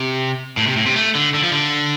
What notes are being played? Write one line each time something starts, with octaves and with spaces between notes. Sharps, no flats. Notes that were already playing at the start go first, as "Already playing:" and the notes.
Already playing: C3
A2
C3
A2
C3
A3
D3
D3
F3
D3